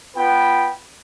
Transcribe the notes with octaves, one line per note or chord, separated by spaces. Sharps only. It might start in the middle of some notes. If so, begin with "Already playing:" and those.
B3 F4 B4 G5 B5